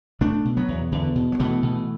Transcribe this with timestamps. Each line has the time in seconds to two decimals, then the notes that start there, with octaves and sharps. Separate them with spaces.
0.21 B2 A3 D4
0.45 B2
0.57 F#3 B3
0.68 E2
0.92 E2 D3
1.15 B2
1.32 F#3
1.39 B2 E3 A3
1.63 B2